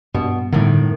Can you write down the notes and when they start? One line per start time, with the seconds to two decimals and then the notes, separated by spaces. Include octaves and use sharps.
0.14 G2 B2
0.52 A2 D3 D#3 G3